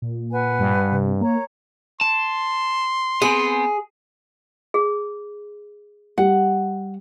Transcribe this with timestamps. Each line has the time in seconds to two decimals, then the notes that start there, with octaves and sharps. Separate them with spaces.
0.02 A#2
0.32 B4 F#5 G#5
0.59 G2
0.92 C3
1.21 A#3 C#5 A#5
2.01 A5 C6
3.22 B3 C4 G#4
4.74 G#4
6.18 G3 F#5